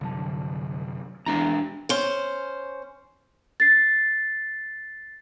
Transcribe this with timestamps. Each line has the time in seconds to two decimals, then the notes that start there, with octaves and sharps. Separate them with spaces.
0.01 C2 F#2 D3 A5
1.26 E2 G#3 D4 E4 A#5
1.89 C#4 C5
3.60 A6 C7